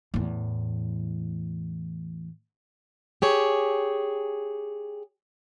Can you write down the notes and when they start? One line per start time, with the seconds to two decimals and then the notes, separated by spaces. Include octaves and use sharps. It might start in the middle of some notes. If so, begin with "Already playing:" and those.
0.14 E2 A2
3.22 G4 G#4 C#5